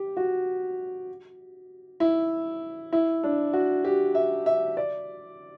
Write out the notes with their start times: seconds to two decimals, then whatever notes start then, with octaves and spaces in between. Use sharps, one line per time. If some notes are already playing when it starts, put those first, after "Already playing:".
Already playing: G4
0.17 F#4
2.00 E4
2.93 E4
3.24 D4
3.53 F#4
3.84 G4
4.15 E5
4.46 E5
4.77 D5